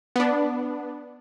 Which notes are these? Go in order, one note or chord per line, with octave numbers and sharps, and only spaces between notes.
B3 D4